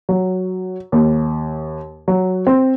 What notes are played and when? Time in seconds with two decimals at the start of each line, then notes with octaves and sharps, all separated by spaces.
0.09 F#3
0.92 D#2
2.08 F#3
2.47 C4